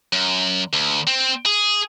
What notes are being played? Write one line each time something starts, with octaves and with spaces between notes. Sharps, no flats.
F#2
D2
C4
G#4